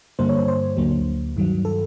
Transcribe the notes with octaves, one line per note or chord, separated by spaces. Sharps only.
G2 D3 G3 A#3 C5
C#5
C5
C5
D2 D3 F#3 A#3
G2 D#3 F#3
A4